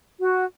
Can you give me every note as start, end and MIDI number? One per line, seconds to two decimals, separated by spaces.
0.21 0.45 66